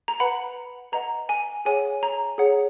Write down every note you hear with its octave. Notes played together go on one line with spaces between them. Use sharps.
A#5
B4 F#5 B5
B4 D#5 F#5 A#5
G#5
G#4 C#5 F#5 G#5
A#5
G#4 C#5 F#5